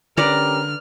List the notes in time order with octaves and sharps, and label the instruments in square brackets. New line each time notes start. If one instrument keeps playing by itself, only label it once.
[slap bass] D3 [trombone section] C#4 G4 A#4 [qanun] B4 D5 A#5 [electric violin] F6